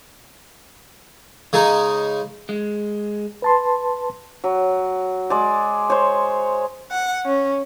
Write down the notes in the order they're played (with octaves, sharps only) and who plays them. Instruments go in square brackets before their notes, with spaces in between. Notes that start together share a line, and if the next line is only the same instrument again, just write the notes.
[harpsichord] C#3 G#3 D#4
[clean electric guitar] G#3
[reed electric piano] B4 A5 C6
[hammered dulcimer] F#3
G#3 D5
C5 C#5
[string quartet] F#5
C#4